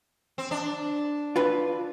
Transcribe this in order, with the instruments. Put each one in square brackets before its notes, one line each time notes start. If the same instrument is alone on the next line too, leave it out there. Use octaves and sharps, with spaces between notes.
[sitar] C4
D4
[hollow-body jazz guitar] F4 B4